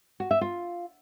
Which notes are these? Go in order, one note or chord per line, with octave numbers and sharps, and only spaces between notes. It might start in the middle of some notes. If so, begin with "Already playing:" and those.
F#4
E5
F4